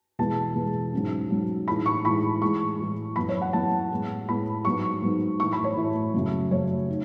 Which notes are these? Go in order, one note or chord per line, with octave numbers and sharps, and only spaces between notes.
E2 B2 G#3 A5
E2 B2 G#3
G#2 F#3 C#4
G#2 F#3 C#4
A2 E3 G#3 D#4 B5
C#6
A2 E3 G#3 D#4 B5
A2 E3 G#3 C#6
A2 E3 G#3
F#2 E3 B3 E4 B5
C#5
F#5
F#2 E3 B3 E4 A5
A2 G#3 B3
A2 G#3 B3 B5
G#2 F#3 B3 D#4 C#6
G#2 F#3 B3 D#4
A2 E3 A3 C#6
B5
C#5
A2 E3 A3
F#2 C#3 F#3 A3
F#2 C#3 F#3 A3 C#5
D#4